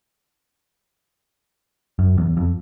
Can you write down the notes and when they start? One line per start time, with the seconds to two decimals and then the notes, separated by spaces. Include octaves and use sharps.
1.99 F#2
2.18 E2
2.37 F2